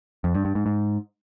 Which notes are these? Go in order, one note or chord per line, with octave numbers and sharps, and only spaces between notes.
F2
G2
G2
G#2
G#2